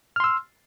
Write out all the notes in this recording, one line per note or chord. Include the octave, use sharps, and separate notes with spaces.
C6 E6 F6